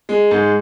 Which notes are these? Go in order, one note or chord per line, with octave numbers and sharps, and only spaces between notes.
G#3
G#2